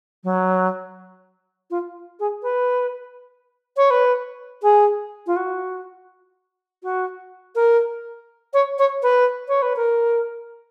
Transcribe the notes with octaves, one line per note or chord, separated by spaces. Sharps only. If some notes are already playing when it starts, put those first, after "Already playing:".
F#3
F4
G#4
B4
C#5
B4
G#4
F4
F#4
F#4
A#4
C#5
C#5
B4
C#5
B4
A#4